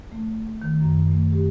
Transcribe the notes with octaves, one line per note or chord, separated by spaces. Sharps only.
A3
D#3
F#2
A3
G4